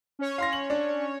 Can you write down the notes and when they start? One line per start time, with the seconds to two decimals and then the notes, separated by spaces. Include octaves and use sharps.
0.19 C#4 C#5
0.38 F5 C6 A#6
0.53 F#7
0.70 D4